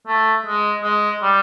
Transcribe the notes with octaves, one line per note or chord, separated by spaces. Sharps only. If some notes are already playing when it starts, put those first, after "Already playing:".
A3
G#3
G#3
G3